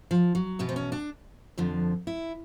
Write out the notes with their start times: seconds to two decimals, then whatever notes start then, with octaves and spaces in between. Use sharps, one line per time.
0.11 F3
0.35 F#3
0.59 E2 B2 B3
0.69 C4
0.76 C#4
0.92 D4
1.58 F2 D3 F3
2.07 E4